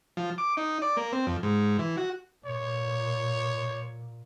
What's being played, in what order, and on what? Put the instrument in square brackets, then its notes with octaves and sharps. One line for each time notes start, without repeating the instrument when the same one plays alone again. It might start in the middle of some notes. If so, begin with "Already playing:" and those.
[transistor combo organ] F3
D6
D#4
D5
A#3
C4
F2
G#2
E3
F#4
[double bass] A#2 [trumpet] C#5